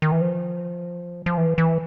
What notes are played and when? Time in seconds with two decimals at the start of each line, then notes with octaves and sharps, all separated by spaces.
0.02 D#3
0.12 E3
0.21 F3
1.26 F3
1.37 E3
1.58 E3